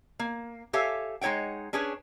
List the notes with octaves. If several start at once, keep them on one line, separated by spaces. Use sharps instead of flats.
A#3
G4 A4 C#5 E5 F5 G#5
G#3 D#4 C#5 F#5 G5
C#4 D4 G#4 B4 C#5